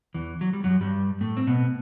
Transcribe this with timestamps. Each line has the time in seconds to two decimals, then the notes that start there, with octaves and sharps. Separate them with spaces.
0.14 E2 E3
0.41 F#3
0.53 G3
0.64 F#2 F#3
0.81 G2 G3
1.21 A2 A3
1.37 C4
1.47 B2 B3